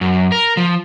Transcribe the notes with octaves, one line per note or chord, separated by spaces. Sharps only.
F#2
A#4
F3